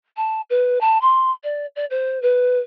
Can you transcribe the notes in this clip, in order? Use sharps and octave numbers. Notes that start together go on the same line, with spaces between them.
A5
B4
A5
C6
D5
D5
C5
B4